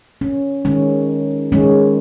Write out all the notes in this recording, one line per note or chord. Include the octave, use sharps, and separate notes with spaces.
C#4
D#3 G#3 C#4
D#3 G#3 C#4